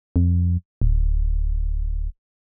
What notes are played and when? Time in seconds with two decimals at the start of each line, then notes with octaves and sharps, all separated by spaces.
0.16 F2
0.82 D1